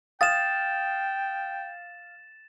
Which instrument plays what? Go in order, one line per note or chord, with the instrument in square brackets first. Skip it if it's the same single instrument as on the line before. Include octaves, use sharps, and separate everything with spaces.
[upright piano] F5 D#6 [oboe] G5 [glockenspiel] A6 E7